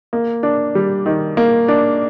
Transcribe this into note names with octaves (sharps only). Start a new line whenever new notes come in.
A#3
D4
G3
D#3
A#3
D4